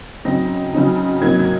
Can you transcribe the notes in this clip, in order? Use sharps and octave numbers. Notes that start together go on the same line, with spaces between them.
C#3 F#3 C4 D#4 A#6
C#3 F#3 C4 D#4
C3 F#3 A#3 D#4 G#6
G#6